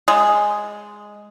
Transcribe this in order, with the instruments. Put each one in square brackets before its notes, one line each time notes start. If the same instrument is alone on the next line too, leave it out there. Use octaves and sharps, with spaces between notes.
[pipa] G#3